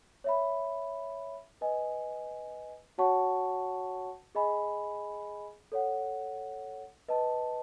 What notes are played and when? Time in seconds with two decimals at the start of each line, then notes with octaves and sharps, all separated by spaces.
0.24 C#5 E5 B5
1.61 B4 D#5 G#5
2.98 F#4 C#5 F#5 A5 C#6
4.35 G#4 D#5 G#5 B5
5.72 A4 C#5 F#5
7.08 B4 D#5 A5